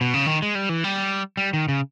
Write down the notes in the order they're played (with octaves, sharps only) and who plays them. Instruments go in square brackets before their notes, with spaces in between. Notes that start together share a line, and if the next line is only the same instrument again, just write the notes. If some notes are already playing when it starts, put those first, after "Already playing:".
[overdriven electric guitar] B2
C#3
D#3
G#3
G3
E3
G3
G3
D#3
C#3